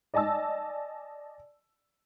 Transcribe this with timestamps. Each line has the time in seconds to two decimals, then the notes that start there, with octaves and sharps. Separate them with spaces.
0.14 D5 D#5 G#5 A5 E6